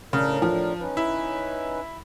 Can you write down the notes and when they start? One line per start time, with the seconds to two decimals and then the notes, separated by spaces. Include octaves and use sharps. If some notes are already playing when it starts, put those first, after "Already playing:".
0.13 A2 C#3 D4 A#4
0.42 F3
0.80 C#4 D#4 B4
0.97 E4